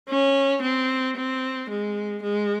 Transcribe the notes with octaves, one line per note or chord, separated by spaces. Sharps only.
C#4
C4
C4
G#3
G#3